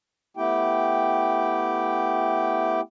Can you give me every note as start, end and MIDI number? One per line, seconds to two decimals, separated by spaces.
0.37 2.81 57
0.37 2.81 59
0.37 2.81 64
0.37 2.81 67
0.37 2.81 79